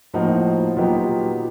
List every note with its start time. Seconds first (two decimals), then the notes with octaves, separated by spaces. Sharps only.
0.14 A2 F3 A#3 D#4 F#4
0.77 A#2 F#3 B3 D#4 G4